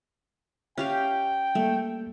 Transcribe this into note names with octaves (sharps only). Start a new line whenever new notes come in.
C#4 G4 E5 F5 G5
G3 A3 A#3